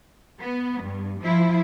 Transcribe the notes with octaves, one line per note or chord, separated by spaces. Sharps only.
B3
G2
F3 E4